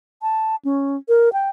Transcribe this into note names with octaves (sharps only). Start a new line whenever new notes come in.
A5
C#4
A#4
G5